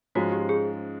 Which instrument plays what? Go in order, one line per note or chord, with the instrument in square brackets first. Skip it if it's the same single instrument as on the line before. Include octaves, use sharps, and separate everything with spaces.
[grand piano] G#2 F3 G#3 C#4 F4 [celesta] F#4
[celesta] G4
G#4